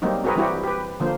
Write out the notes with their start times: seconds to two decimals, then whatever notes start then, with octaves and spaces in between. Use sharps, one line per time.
0.02 F#3 G3 A#3 C4 D#4
0.24 C4 F#4 G#4 A#4 B4
0.36 E3 G3 C4 E4 F#4 G4
0.64 G4 B4
1.00 D3 F3 A#3 C5